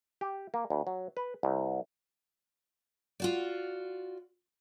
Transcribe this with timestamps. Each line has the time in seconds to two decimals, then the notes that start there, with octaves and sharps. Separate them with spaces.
0.21 G4
0.54 A#3
0.70 D2
0.87 F#3
1.17 B4
1.43 C2
3.20 F4 F#4 D5